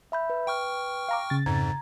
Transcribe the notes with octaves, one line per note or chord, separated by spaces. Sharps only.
E5 B5 G6
B4
G5 C#6 F6
F5 A#5 D6
C#3 A6
F2 G#2 A#5 G#6